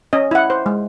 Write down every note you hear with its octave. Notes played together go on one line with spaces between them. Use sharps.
C#4 D#5
E4 F#5
C5
G#3